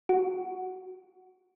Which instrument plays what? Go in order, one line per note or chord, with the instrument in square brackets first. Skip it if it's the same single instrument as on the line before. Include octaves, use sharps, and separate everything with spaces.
[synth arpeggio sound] F#4